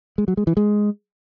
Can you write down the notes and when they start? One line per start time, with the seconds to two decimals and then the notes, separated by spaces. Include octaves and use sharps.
0.18 G#3
0.28 F#3
0.37 G#3
0.47 E3
0.57 G#3